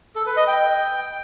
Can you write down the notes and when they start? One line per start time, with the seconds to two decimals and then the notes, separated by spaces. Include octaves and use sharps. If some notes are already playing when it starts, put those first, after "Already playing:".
0.16 A4
0.26 B4
0.37 D#5
0.47 G5